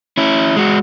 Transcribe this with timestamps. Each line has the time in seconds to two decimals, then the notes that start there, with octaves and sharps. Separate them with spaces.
0.17 C#4 E4
0.56 G#3 F#4